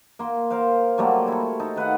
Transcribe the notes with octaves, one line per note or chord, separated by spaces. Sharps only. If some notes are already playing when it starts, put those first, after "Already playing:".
A#3 C6
A#4 C5 F5
F#3 G3 A3 A#3
E4 A4
D#4 A4
D#3 B4 F5 F#5